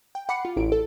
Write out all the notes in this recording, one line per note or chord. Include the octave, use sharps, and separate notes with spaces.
G5
F#5 B5 D6 C7 C#7
F4
A1 E4 D7
A4